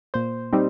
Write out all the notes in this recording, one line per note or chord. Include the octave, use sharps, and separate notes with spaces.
A#2 C5
G3 C4 D#4